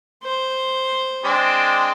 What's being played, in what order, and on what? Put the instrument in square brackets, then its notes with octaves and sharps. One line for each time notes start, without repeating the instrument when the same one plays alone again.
[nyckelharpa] C5
[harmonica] G#3 C4 D4